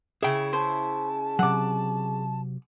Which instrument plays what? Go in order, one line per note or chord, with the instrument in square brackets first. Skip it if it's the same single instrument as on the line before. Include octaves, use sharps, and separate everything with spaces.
[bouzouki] C#3 E4 [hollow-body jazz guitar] G#4 G5
[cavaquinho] C5 [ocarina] A5
[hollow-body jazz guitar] C3 F#3 [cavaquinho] F#5 D6